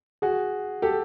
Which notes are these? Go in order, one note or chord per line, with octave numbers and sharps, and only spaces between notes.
F#4 G#4
G4 A4